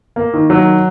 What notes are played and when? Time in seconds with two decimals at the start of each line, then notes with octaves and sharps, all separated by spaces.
0.16 A#3
0.34 D#3
0.50 F#3